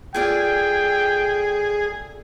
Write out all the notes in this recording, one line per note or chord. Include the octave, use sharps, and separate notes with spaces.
A3 F4 G#4 D5 G5